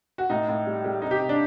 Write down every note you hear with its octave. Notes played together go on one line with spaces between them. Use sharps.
F#4
A2 D#4
A2
G3
G3
C3 D#4
G4
C3
D4